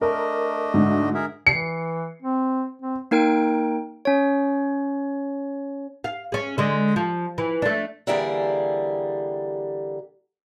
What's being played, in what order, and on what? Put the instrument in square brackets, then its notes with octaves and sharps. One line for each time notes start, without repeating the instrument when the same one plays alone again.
[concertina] A3 D4 D#5 [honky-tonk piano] A#4
[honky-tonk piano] D2 G#2
[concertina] G#4 A#4 E5
[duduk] E3 [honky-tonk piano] C7 C#7
[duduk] C4
C4
[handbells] A#3 D#4 A#4 G5 D7
C#4 C#5
[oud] F5
C#4 G#4
D3 G#3
F3
E3
A3 D4
[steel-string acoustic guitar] D3 E3 G3 A#3 G4 G#4